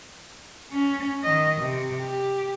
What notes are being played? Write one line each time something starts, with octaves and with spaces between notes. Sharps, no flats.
C#4
D#3 D#5
C3
G4